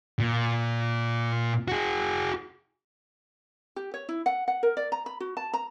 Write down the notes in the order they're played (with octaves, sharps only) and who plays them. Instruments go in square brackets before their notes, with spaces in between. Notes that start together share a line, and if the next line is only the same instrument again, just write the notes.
[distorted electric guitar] A#2
F#4 G#4
[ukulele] G4
C#5
E4
F#5
F#5
A#4
D5
A#5
B5
F#4
A5
A#5